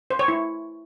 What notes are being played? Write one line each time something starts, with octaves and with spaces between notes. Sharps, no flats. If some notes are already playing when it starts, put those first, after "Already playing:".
C5
C#5
E4